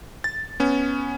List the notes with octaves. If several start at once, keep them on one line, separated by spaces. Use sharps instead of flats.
A6
B3 C#4